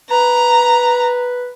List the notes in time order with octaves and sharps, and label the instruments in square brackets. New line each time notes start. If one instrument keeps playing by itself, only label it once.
[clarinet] B4 [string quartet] A#5